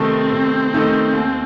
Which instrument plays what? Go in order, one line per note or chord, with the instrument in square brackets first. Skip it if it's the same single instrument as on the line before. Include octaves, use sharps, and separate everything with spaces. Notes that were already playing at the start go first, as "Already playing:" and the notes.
Already playing: [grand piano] C3 D#3 A3 D#4 A4 [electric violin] C4
[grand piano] C3
D#3 A3 D#4 A4
D#2